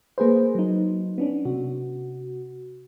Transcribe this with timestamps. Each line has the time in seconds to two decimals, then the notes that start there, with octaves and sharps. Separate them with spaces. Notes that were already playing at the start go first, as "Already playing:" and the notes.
0.18 A#3 G#4 B4 C5
0.55 F#3 D#4
1.18 B3 C#4 D4
1.45 C3 F#4